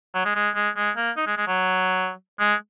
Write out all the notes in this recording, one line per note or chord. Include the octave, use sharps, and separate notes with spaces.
F#3
G#3
G#3
G#3
G#3
A#3
D#4
G#3
G#3
F#3
G#3